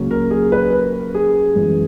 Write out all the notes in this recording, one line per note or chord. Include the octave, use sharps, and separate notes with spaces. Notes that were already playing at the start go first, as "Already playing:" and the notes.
Already playing: C#2 C#3 F#3 A#3 C#4
A#4
G#4
B4
A#4
G#4
F#2 E3 G#3 B3